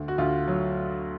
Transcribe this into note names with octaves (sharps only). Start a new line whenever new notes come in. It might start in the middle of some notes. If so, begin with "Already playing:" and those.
Already playing: D2
F#4
D2 F4
F#3